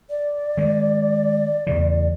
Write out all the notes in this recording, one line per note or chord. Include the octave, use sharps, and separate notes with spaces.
D5
D#3 G#3
E2 C#3 E3